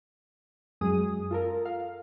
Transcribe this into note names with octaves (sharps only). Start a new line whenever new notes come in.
F#2 G#3 G#4 D#6
F4 A4 A#4
F5